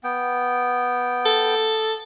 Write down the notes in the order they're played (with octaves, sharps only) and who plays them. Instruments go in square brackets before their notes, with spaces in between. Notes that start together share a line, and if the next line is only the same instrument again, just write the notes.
[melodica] B3 G5
[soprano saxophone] A4